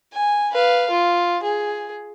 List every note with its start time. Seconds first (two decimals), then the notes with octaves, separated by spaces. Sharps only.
0.13 G#5
0.52 B4 F5
0.90 F4
1.43 G#4